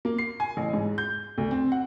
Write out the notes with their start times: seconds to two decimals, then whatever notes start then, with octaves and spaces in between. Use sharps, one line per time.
0.05 A#3
0.18 C7
0.40 G#5
0.57 A1
0.73 G#2
0.98 G6
1.38 D2
1.51 C4
1.72 F#5